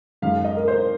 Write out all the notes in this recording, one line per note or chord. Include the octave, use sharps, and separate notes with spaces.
F#2 D#3 G#3 F5
D#5
A#4
C5